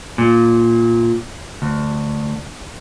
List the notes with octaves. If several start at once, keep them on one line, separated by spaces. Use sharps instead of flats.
A#2
D2